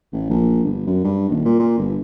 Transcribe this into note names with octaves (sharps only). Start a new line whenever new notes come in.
A1
A#1
G1
F#2
G2
D#1
A#2
A#2
G1